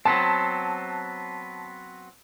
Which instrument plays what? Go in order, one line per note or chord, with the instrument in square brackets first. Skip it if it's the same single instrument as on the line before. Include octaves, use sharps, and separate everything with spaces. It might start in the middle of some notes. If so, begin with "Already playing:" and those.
[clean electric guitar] F#3 B3 C4 [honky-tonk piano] A5